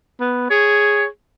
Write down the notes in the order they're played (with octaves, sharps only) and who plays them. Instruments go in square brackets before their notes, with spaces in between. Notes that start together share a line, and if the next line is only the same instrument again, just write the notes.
[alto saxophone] B3
[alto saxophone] G#4 [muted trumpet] C#5